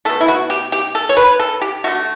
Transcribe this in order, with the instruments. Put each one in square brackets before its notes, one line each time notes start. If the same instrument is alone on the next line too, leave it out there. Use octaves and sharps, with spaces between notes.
[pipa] A3 A4
B2
E4
F#4
G4
G4
A4
C#5
B4
A4
G4
D3 A3 F#4